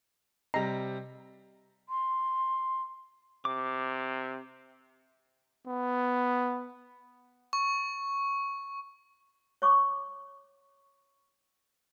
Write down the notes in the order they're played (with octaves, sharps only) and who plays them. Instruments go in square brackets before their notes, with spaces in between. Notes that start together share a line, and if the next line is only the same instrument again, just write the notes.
[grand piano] C3 G3 [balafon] D#5 [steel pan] A#5
[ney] C6
[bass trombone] C3 [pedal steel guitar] D6
[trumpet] B3
[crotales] C#6
[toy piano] C#5 C#6 D6